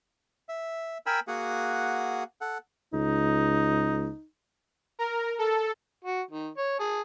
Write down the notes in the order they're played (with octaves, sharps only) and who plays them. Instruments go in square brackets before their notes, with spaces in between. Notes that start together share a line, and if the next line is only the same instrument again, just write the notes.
[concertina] E5
A#4 G5 G#5 B5 E6
A#3 F#4 G#4 F#5
A4 F#5
[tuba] C#2 [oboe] D#4
[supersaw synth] A#4
A4
[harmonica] F#4
D#3
C#5
G#4 A5